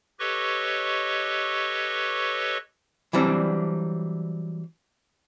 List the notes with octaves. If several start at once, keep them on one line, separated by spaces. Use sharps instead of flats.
G4 A4 B4 C#5 D#5 C#6
E3 F#3 G3 C4 D4